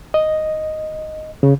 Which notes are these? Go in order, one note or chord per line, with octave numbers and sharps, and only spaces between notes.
D#5
C#3